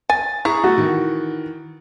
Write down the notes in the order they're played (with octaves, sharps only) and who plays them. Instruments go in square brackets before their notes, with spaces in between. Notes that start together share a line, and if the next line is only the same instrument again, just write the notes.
[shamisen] G#5 [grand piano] A6
[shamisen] E4 [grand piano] G#4 A#5 C#6
[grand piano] A3 [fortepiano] F#4
[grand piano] D#3 E3